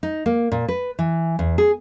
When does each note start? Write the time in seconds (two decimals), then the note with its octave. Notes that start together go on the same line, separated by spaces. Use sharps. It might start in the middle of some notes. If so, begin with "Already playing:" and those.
0.03 D#4
0.26 A#3
0.52 A#2
0.68 B4
0.99 E3
1.39 E2
1.58 G#4